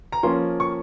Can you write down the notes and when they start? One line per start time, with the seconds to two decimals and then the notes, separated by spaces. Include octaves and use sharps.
0.12 A#5
0.23 F3 A#3 C#4 C6
0.60 C#6